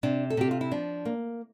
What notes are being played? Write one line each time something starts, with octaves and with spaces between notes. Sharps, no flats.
C3 D4
A4
C3 G4
F4
E4
F3 D4
A#3